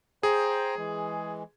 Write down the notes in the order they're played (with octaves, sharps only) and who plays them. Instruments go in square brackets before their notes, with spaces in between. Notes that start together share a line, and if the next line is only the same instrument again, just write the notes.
[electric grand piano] G#4 [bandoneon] C5 G5 A#5
[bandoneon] E3 G#3